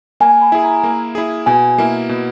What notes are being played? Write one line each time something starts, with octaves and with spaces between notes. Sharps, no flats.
A#3 G#5
B5
E4 G#4 G#5
A#5
A#3
E4 G#4
B2 G#5
A#3 E4
B2